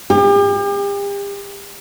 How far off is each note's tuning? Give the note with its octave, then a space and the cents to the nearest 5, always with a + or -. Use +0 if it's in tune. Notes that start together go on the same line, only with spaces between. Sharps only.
G4 +40